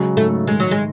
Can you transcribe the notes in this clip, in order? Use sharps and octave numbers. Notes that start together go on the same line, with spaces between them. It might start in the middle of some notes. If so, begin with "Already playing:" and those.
Already playing: C#3 F#3 G#3
G#2 A3
D#3 G#3
F#3
G#3